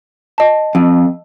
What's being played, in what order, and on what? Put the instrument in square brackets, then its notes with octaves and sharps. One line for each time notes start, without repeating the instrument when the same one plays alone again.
[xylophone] D#5 A5
[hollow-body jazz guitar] F2